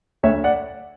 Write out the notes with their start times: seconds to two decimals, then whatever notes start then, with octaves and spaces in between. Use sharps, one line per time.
0.23 D2 C#5 E5
0.44 D5 F#5